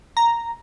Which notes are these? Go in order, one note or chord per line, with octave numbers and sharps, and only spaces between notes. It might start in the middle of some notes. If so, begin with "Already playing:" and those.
A#5